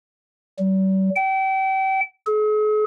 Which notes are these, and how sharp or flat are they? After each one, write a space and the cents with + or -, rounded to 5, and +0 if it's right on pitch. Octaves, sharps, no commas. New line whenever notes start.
G3 -45
G5 -35
G#4 +45